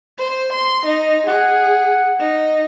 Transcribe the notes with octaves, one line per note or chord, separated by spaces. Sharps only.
C5
C6
D#4
G#4 F#5
D#4